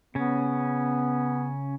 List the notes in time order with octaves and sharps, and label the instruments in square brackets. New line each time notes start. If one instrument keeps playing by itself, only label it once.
[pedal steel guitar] C#3 C#4 [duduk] B3